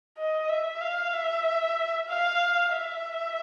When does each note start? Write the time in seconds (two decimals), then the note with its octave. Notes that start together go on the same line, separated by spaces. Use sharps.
0.18 D#5
0.49 E5
0.81 F5
1.13 E5
2.09 F5
2.72 E5